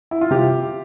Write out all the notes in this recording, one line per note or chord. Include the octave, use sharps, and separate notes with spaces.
E4
F4
C3 G4